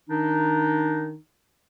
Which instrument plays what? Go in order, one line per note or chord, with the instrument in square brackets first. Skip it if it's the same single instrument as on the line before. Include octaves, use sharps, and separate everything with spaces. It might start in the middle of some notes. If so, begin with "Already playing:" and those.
[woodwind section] D#3 D4 D#4